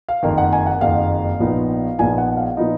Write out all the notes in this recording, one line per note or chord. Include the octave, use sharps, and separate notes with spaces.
F5
F#1 F2 D#3 A#3
F#5
G#5
F#5
F#1 F2 D#3 A#3 F5
A#1 A#2 F3 B3 D#4
A#1 A#2 F3 B3 D#4 G#5
F#5
F5
A#2 F3 B3 D#4 D#5